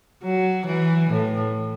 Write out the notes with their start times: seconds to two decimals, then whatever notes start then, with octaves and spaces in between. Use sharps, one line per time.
0.23 F#3
0.66 E3
1.10 A2